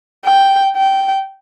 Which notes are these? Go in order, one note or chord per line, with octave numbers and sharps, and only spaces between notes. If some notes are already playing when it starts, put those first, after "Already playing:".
G5
G5